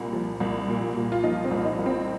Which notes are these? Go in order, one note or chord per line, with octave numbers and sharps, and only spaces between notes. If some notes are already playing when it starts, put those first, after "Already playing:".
Already playing: C2 A#2
F3
C2
A#2
A#2
F4
F3 D#4
C4
C2
D#4
C2
C4